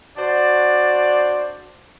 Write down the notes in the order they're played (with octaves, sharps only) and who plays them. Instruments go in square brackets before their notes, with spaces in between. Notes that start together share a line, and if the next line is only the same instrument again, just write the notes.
[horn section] D4 F#4 C5 D5